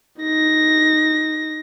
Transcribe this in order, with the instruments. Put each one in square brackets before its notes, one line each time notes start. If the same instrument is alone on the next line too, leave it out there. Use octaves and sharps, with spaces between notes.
[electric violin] D#4 A#6